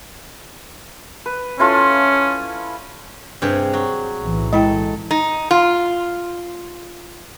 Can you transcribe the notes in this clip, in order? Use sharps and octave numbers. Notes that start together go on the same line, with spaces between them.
B4
C#4 E4 F4 A4
G2 C3 G#4
F#3
B1 A2 E3
G#3 E4 A4 G5
D#4
F4